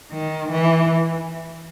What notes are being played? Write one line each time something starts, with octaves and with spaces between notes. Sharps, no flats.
D#3
E3